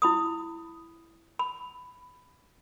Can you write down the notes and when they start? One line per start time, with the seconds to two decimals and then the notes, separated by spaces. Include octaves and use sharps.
0.02 E4 B5 D#6
1.39 B5